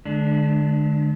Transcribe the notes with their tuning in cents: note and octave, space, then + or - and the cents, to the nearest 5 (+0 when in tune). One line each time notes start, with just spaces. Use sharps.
D3 +25 G#3 +40 D4 +0